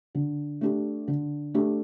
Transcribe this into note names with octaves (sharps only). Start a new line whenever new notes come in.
D3
A3 D4 G4
D3
A3 D4 G4